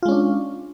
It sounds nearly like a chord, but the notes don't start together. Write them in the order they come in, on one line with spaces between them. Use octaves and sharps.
F4 G#3 C#4 D4